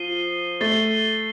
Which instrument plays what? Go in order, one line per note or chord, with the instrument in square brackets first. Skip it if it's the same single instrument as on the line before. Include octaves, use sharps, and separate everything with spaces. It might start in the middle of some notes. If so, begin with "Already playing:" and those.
Already playing: [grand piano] F3 [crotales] C7 D#7 G7
[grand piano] A3 [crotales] A6 C7 G7